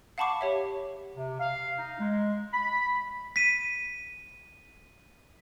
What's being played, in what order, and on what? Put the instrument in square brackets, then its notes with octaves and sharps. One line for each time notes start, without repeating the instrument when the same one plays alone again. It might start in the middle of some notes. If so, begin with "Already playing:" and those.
[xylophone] F5 F#5 A5 B5 C#6 D6
G4 C#5 E5
[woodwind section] C3
F5
D#4
G#3
B5
[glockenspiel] B6 D#7